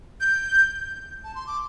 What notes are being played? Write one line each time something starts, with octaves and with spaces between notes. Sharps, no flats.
G6
A5
C6
D6